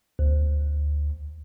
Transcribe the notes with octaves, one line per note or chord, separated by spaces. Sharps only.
D2